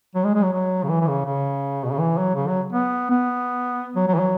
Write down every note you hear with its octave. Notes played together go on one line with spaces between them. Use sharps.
F#3
G#3
G#3
F#3
F#3
C#3
E3
E3
C#3
C#3
B2
C#3
E3
F#3
C#3
F#3
B3
B3
F#3
F#3
E3
F#3